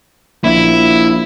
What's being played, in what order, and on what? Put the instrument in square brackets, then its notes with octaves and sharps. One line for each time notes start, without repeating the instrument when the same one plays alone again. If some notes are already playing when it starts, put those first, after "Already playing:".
[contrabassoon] A#1 [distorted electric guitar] E4